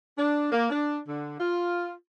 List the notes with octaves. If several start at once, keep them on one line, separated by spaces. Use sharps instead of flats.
D4
A#3
D4
D3
F4